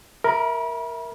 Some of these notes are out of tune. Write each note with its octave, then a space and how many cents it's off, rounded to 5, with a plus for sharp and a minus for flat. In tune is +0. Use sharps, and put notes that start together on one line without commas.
A#4 +0 E5 -10 B5 -35